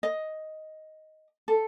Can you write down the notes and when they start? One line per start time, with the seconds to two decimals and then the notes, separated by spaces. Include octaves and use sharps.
0.03 D#5
1.48 A4